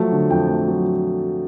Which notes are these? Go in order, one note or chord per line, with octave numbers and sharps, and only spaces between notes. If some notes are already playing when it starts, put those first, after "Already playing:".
Already playing: F3 F#3 A3
D3
F2 G5
A3
F#3